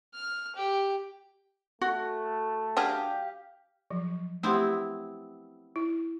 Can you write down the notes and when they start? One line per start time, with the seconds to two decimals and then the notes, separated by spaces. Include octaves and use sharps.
0.14 F6
0.56 G4
1.81 A3 F#4
2.77 F#3 D4 G4 G#4 F5
3.91 F3 F#3
4.43 A3 B3 C4 E4 G4
5.76 E4